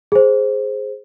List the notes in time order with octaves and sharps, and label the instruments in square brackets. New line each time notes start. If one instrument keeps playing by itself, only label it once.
[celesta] G#4 C5